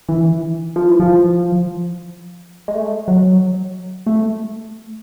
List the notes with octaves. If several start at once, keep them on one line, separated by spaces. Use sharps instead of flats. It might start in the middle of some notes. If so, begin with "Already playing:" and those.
E3
F3
E3
F3
G#3
A3
F#3
A3